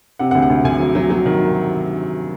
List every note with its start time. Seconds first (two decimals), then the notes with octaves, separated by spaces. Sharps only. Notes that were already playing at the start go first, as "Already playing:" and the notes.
0.19 C3 F#5
0.31 F#5
0.35 D2
0.42 F#5
0.50 D2
0.64 D2 G#5
0.80 F#3
0.95 F#3
1.10 F#3
1.26 D#3